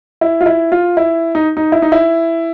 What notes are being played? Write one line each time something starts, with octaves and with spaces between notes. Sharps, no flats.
E4
F4
E4
F4
E4
D#4
D#4
E4
D#4
E4